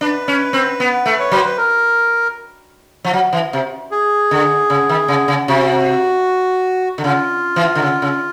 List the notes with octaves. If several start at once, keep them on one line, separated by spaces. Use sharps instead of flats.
D4 B4
C#4
C4
B3
A3
C#5
F#3 C5
B4
A#4
F3
F#3
E3
C3
G#4
D3
C#3
D#3
C#3
C#3
C3 F#4
D3
C#3 F4
E3
D3
C#3
C#3